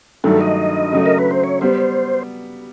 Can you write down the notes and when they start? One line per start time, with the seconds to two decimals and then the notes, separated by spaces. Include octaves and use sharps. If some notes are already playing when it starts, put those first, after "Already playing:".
0.24 G2 D#3 F#3 A3 D4 A4
0.41 D#5
0.92 C#3 F#3 A3
1.06 A#4
1.19 B4
1.31 C5
1.44 C#5
1.61 G3 B3 C5